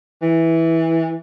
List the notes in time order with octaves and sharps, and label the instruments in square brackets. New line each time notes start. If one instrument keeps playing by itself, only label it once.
[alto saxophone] E3